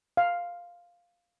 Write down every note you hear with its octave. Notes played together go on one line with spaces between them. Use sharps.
F5